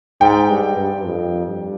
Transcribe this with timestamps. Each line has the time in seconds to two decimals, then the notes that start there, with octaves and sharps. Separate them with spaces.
0.21 G#2 G5
0.49 G2
0.77 G2
1.05 F2
1.47 G2